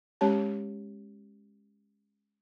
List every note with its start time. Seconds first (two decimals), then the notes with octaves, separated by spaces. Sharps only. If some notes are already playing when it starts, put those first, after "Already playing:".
0.21 G#3 C#4 G4 C#5 A5